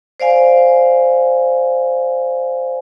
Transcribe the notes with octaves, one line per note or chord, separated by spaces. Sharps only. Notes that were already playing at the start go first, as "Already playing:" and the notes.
C5 D5 F5 G#5